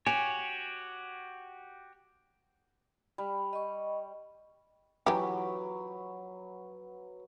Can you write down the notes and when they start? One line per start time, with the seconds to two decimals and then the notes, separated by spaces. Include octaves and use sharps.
0.06 F#4 G4 C#5 G#5
3.18 G3
3.53 D#5 C#6
5.06 E3 F#3 G4 B4